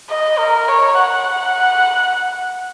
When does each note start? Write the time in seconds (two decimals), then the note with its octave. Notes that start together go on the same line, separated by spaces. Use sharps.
0.09 D#5
0.38 A#4
0.69 C#5
0.99 F#5